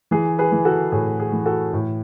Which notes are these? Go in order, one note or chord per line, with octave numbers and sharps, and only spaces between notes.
E3 G#4
G#4 B4
E3
F#4 A4
A2 G#4
G#4
E3
F#4 A4
A2